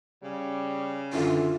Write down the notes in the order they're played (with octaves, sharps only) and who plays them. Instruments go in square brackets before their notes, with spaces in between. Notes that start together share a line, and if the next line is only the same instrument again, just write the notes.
[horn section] C#3 [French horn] G3
[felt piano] F#2 D3 [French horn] E3 [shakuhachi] F4